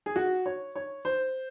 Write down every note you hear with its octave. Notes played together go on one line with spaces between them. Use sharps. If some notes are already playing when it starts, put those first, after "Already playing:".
G#4
F#4
C#5
C#5
C5